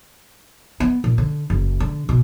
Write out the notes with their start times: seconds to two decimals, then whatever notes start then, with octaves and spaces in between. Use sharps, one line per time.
0.80 B3
1.04 A#2
1.18 D3
1.50 F#1
1.80 D3
2.09 B2